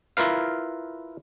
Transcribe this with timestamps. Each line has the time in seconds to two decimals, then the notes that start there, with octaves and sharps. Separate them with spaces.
0.17 E4 F4 A#4 B4 F5